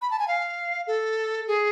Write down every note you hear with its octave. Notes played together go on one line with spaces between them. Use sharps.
B5
A5
G#5
F5
A4
G#4